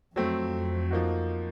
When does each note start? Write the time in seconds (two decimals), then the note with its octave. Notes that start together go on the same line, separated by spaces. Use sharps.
0.16 F2 F#3 A3 C4
0.90 F3 A#3 D#4 F#4